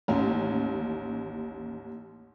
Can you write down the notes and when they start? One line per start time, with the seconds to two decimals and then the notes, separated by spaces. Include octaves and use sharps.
0.08 A1 D#2 C#4